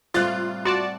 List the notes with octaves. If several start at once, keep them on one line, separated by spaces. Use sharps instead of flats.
A2 C3 G3 F4 F#6 A6
F#4 D5 A5 C6